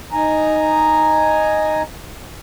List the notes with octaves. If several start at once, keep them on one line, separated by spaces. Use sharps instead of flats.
D#4 G#5 A#5